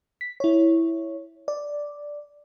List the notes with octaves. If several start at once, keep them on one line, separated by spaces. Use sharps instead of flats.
B6
E4 C#5
D5